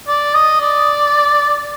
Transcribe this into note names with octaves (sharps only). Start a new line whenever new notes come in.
D5
D#5
D5